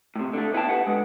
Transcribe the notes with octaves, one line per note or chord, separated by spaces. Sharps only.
A2 C3
D3 A3
B3 E4 G4 G5 A5
G4 B4 F#5
D3 G#3